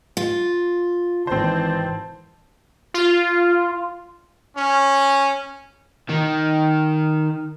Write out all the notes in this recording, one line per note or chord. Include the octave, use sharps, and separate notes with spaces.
F4
G#1 E3 C4 C5 A5
F4
C#4
D#3